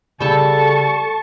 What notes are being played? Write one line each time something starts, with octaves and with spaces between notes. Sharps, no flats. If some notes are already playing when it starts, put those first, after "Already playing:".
C#3 G3 A4 A5 C#6